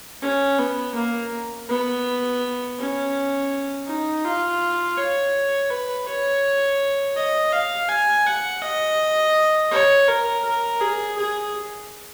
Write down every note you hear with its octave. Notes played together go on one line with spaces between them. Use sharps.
C#4
B3
A#3
B3
C#4
D#4
F4
C#5
B4
C#5
D#5
F5
G#5
F#5
D#5
C#5
A#4
A#4
G#4
G#4